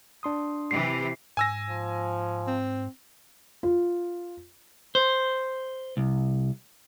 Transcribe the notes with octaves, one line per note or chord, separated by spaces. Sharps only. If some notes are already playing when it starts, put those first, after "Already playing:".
D4 C6 D#6
C3 E3 G4 C7
G#2 G#5 E6 A#6
F3
C4
F4
C5
C2